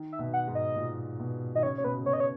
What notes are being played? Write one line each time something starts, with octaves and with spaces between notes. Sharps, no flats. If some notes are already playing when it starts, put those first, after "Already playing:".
Already playing: D#3
E5
B2
F#5
G#2
D#5
A#2
B2
D#3 D#5
C#3 C#5
C#3 C#5
B2 B4
C#3
B2 C#5
D#5
C#5